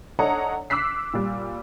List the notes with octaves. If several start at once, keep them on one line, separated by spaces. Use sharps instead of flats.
D4 A4 C#5 D#5 F#5 A#5
D6 E6 F#6 B6 C7
A#2 G3